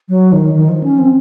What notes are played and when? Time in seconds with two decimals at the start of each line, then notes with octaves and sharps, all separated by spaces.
0.09 F#3
0.32 D#3
0.54 D#3
0.69 F3
0.84 C#4
0.99 C4